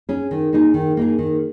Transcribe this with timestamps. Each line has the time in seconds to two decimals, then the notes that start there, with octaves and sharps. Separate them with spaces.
0.09 C#4 G#4
0.31 D#3
0.53 A#3 D#4 G#4
0.74 D#3
0.97 A#3 D#4 G#4
1.19 D#3